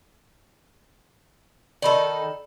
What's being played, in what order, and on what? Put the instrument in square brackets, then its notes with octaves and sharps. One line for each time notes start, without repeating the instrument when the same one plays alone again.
[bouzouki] D#3 D#4 A4 [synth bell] D5 B5